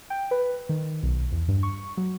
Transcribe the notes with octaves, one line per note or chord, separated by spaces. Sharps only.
G5
B4
D#3
B1
E2
G2
C#6
F#3